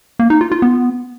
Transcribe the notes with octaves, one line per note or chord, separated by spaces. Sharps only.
A#3
D#4
F4
F4
B3